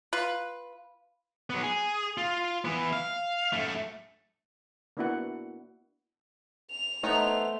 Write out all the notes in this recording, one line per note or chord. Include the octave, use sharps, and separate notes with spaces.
F4 B4
F#3 B3
G#4
F4
E3 B3
F5
F#2 A3
A#3 B3 D4 E4 F#4 F#5
F7
E3 A3 B3 D#4 C5 C#5